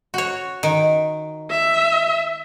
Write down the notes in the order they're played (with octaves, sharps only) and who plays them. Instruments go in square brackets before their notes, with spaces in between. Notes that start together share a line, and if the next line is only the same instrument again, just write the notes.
[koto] F#4 C#5
D#3
[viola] E5